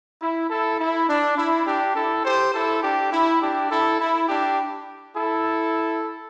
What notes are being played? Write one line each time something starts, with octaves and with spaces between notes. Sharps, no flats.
E4
E4 A4
E4
D4
E4
D4 G4
E4 A4
G4 C5
E4 A4
D4 G4
E4
D4 G4
E4 A4
E4
D4 G4
E4 A4